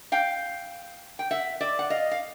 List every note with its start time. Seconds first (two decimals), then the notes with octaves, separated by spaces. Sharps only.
0.12 F5 G5
1.19 G5
1.31 E5 F#5
1.61 D5 E5
1.79 F#5
1.90 D#5 F5
2.11 F5